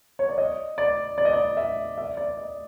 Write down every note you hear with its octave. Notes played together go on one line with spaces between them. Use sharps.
C#5
D5
D#5
D5
D5
D#5
D5
E5
E5
D5
D#5